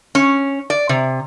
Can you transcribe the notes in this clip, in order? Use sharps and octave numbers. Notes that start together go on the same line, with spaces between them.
C#4
D5
C3